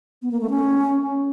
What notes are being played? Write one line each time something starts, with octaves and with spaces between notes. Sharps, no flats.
B3
A#3
A3
C#4